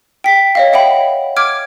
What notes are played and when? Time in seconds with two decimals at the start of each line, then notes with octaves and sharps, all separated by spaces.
0.24 G5 B6
0.55 C#5 D#5 F5
0.73 E5 F#5 G5 B5
1.36 D6 F6 G#6 D7